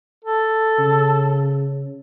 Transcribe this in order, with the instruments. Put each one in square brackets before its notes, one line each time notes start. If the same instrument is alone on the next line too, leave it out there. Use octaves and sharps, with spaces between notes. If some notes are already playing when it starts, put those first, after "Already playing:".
[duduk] A4
[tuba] C#3